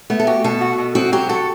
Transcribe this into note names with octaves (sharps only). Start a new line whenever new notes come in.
A3 B3
A4
F#4 G4
B2 A4
F#4
B2
C4 F#4
F#3 G4
F#4 A4